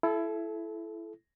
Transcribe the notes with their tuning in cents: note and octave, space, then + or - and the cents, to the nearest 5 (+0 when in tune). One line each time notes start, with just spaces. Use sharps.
E4 +20 A4 -25